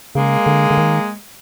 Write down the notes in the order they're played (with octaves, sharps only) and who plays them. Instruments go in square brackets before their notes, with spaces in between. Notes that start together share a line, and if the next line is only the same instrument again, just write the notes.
[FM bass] C#3 [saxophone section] G#3 A#3
[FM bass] D3
D3
D#3